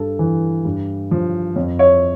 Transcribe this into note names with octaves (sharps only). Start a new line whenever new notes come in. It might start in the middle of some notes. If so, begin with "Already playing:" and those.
Already playing: G2 A4
E3
G2
F3
F2
C#5 E5